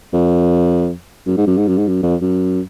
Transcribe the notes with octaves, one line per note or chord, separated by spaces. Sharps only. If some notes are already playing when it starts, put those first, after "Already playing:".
F2
F#2
G#2
F#2
G#2
F#2
G#2
F#2
F2
F#2